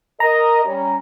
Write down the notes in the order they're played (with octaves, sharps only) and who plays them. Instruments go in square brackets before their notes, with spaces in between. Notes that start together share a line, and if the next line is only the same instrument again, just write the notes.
[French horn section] A#4 D#5 [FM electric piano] A#5
[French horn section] G3 C#4